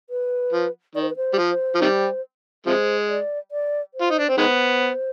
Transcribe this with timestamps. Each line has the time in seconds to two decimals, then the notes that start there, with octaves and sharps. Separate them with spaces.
0.10 B4
0.52 F3
0.95 D#3 D5
1.02 C5
1.10 B4
1.16 C5
1.33 G3
1.38 F3
1.74 F3
1.81 C3 D#3 G3
2.66 C3 F3 G#3 C5
3.09 D5
3.51 D5
3.94 C5
4.01 F4
4.10 D#4
4.19 D4
4.28 C4
4.33 D5
4.37 D#3 G#3 B3 C5